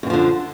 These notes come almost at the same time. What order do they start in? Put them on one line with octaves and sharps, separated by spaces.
F#2 E3 F3 D3